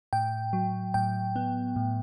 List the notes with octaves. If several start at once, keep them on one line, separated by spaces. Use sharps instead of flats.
A2 G5
F#3
A2 G5
B3
A2